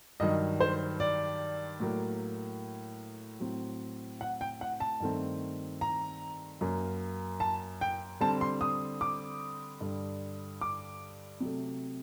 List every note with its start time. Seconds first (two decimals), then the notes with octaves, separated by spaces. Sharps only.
0.20 G2 D#3 F#3 D#5
0.60 C5
1.00 D5
1.80 A2 F#3 A#3
3.40 A2 F#3 C4
4.21 F#5
4.41 G5
4.61 F#5
4.80 A5
5.00 G2 D#3 A3 C4
5.81 A#5
6.61 F#2 F#3 A#3
7.40 A5
7.81 G5
8.21 D3 G3 C4 A5
8.41 C6
8.61 D#6
9.01 D6
9.81 G2 D3 G3
10.61 D6
11.40 C3 F#3 A3